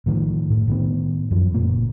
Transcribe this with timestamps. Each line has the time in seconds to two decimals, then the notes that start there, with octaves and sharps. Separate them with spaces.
0.06 A2 D#3 F3
0.50 A2
0.68 A2 D#3 B3
1.31 F#2 F3
1.54 F#1 A#2 A#3